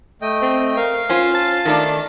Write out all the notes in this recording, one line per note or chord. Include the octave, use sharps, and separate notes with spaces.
A3 D#5 G5
C4
A#4 F5
C#4 F4 C5
A5
D#3 A3 D4